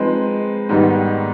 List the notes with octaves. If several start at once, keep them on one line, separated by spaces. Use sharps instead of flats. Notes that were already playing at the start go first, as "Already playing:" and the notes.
Already playing: F3 G#3 C4 D#4 B4
G#2 D#3 G3 B3 D#4